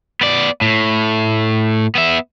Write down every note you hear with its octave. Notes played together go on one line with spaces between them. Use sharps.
B3 D5
A2
B3 E5